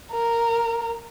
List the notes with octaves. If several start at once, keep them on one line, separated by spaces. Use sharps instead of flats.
A#4